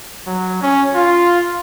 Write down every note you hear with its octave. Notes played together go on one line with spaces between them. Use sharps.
F#3
C#4
F4